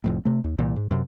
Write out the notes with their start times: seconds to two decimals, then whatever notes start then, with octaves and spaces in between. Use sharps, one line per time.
0.04 F1 F2 A2
0.25 C3 A3
0.44 D#2
0.58 C2 A#2 E3
0.76 G#2
0.91 F#2 C3